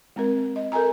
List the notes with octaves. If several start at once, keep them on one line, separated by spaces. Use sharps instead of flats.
G#3 C4 A#4
D#5
A4 A#4 D#5 G#5 A#5